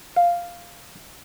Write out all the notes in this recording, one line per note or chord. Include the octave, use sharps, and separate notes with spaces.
F5